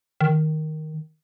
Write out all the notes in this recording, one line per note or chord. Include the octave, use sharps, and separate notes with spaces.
D#3